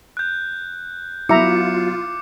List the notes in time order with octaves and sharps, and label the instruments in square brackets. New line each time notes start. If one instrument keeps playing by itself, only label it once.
[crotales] F#6 G6
[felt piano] F#3 B3 [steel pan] E4 E5 A#5 [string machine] F4 [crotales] D6 C#7